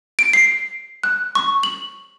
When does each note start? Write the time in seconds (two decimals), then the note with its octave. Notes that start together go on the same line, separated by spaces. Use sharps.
0.19 D7
0.33 C7
1.04 F#6
1.35 C#6
1.63 F#7